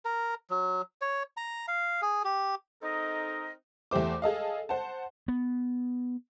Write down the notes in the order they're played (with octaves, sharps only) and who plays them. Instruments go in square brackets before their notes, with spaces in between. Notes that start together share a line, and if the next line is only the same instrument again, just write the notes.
[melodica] A#4
F#3
C#5
A#5
F5
G#4
G4
[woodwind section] C4 D#4 A4 A#4 D#5
[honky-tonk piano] E2 A3 G4 C5 D6
G#4 A4 D#5 F5
C5 F#5 A5
[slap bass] B3